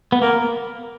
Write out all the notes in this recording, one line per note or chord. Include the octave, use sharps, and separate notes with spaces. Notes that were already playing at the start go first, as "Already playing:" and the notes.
B3
A#3 A#4